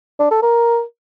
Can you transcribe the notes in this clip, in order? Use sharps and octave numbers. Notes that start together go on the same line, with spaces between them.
D4
A4
A#4